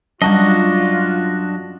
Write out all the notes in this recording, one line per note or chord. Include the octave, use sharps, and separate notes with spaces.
F#2 G3 D4 F4 F#4 D#5 A5